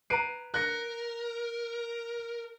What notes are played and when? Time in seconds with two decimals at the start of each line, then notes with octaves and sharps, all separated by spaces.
0.10 B4 A#5 C7 D7 D#7
0.54 A#4 F#6 A#6 C#7